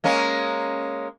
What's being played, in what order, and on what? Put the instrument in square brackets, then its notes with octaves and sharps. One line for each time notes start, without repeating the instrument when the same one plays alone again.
[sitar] G#3 A#3 C#4